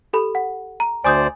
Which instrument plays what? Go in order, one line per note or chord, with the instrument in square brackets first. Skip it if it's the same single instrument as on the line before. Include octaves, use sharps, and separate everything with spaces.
[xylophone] G4 A4 B5
F#5
A#5
[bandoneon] D2 C5 D5 [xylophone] G#5 D#6 G6